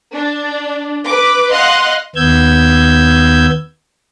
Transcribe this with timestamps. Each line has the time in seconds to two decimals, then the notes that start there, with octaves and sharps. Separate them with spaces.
0.15 D4
1.06 B4 D6
1.52 D#5 F5 F#5 C6 F#6
2.16 D#2 B3 E6 G6 G#6